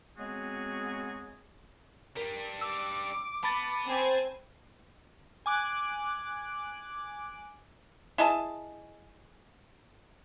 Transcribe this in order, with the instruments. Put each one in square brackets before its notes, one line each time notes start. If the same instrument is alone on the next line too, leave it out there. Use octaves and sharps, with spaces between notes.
[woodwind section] F#3 G#3 B3 C4 F#4 G#4
[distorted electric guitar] G3 D4 [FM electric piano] A#4
[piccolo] D6 [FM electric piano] E6
[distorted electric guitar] B3 [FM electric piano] A5 B5 A6
[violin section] C4 C5 G#5
[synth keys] G#5 D6 F#6
[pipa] E4 G#4 D#5 A5